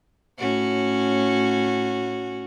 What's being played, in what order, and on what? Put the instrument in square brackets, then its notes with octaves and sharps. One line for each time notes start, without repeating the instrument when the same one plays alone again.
[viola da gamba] A2 C#4 F#4